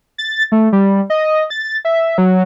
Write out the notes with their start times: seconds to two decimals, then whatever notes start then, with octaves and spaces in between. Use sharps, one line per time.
0.18 A6
0.52 A3
0.72 G3
1.10 D#5
1.50 A6
1.85 E5
2.18 F#3